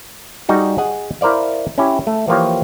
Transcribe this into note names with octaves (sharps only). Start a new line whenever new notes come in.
G3 D#4 F#4 G#4
G#4 D#5 F#5 G#5
E4 A#4 C5 D5 F5
C#4 E4 G4
A3
E3 F3 A#3 F4 G4 C#5